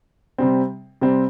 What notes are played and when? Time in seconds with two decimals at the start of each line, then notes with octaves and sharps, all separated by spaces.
0.38 C3 G3 C4
1.01 C3 G3 C4